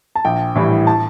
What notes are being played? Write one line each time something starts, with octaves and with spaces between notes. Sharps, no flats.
A5
A#1 G5
A2 E3 G3
A5